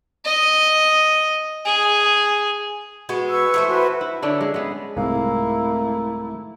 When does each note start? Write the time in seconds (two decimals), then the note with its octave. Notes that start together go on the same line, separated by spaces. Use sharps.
0.25 D#5
1.66 G#4
3.09 G#3 B3 F#4
3.28 B4 C#6 E6
3.54 E3 A3 C5
3.68 F#4 B4
4.01 E4
4.22 D3 C#4 D4 E4
4.41 G#3
4.54 G#3 B3
4.97 C2 G#2 A3 A#3 E4 G#5